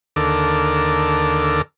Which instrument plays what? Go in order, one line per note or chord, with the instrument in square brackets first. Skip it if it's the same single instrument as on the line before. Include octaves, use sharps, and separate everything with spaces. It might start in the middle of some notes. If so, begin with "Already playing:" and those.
[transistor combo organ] D#2 D3 A4 A#4 D6